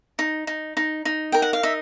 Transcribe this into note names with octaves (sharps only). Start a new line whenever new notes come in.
D#4
D#4
D#4
D#4
A#4 G5
F#5
F5
D#4 E5